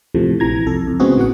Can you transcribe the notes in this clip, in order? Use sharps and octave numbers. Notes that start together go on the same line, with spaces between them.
E2 A2 C3 F3 A3
A#1 E3 A#5 G#6
C2 F2 A4
F2
C#3 G#3 B3 C4 F#4 G#4
A1 E3 F#4 F#5